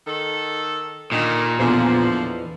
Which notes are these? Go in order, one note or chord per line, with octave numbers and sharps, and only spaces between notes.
D#3 A4
A#2 D3 D#3
E2 B2 D3 E3 F3